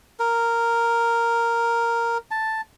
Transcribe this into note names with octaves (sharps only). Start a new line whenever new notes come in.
A#4
A5